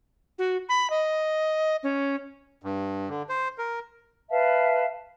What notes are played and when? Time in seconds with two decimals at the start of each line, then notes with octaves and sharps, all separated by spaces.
0.39 F#4
0.69 B5
0.90 D#5
1.83 C#4
2.62 G2
3.09 D3
3.29 C5
3.58 A#4
4.30 B4 E5 F5 A5